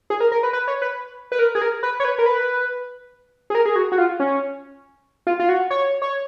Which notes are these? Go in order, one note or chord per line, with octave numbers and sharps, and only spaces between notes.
G#4
A#4
A#4
B4
B4
C#5
B4
B4
A#4
G#4
A#4
B4
C#5
B4
A#4
B4
G#4
A#4
G#4
F#4
F#4
F4
C#4
F4
F4
F#4
C#5
C#5